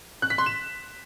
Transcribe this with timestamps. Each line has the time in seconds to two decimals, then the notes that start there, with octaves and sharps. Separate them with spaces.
0.22 F#6
0.30 B6
0.38 C6
0.46 E7